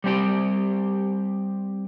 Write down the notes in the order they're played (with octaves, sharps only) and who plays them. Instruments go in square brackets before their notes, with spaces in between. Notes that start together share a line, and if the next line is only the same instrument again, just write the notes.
[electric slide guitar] G3 C4 G4